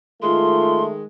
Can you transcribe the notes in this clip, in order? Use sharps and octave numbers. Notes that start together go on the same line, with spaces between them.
D#3 G#3 A3 F4 C6